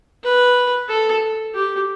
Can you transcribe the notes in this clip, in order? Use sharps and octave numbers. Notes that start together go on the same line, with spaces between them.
B4
A4
G4